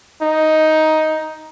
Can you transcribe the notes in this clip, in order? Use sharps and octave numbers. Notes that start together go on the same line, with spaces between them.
D#4